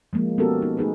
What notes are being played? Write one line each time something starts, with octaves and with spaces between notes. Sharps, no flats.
F3 G#3 A#3
B3 C#4 F#4 G4 A4 A#4
D#4
A3 D#4 G#4 B4